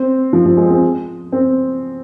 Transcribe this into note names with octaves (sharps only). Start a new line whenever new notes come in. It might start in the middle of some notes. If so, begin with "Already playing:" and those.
Already playing: C4
F3
F3
G#3
C4
C4